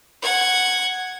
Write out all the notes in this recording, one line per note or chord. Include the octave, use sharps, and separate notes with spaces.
F#5 G#6